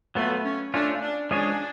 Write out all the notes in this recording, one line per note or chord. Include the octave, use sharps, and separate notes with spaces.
F#3 A3 B3 F4 B4
C#4
A3 C#4 D4 F4
D4
F3 G#3 C#4 D4 G#4 C#5